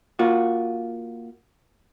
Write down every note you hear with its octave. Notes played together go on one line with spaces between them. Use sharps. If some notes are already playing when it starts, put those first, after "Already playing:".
A#3 F4 F#4